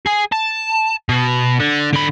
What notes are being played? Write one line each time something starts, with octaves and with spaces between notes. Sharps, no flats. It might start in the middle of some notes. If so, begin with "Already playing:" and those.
G#4 G#5
A5
B2
D3
D3 B5